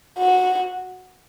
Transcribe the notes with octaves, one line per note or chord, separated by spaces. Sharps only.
F#4